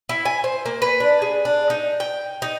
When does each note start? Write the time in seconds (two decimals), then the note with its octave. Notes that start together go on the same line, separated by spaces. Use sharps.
0.09 E4
0.25 G#5
0.44 C5
0.66 A#3
0.82 B4
1.00 D4
1.22 G#4
1.45 D4
1.70 D#4
2.00 G5
2.42 D#4